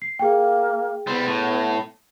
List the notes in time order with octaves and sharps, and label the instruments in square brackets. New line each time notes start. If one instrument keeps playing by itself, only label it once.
[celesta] C7
[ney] A#3 [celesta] G#4 G5
[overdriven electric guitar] G3 C5 [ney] B3
[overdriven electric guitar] A2